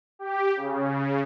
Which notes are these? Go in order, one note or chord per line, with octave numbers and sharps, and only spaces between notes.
G4
C#3